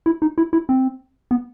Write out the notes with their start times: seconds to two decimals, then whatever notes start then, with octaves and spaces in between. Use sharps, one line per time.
0.06 E4
0.22 D#4
0.38 E4
0.53 E4
0.69 C4
1.31 B3